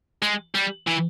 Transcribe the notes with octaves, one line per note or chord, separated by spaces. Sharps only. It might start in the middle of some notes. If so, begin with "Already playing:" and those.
G#3
G3
E3